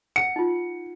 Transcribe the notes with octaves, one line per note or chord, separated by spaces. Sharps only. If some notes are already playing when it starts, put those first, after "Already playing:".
F#5 C#7
D#4 F4